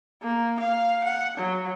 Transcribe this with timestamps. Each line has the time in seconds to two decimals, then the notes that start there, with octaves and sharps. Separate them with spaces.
0.23 A#3
0.60 F5
1.04 F#5
1.38 F#3